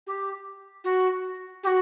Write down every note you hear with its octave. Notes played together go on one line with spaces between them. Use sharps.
G4
F#4
G4
F#4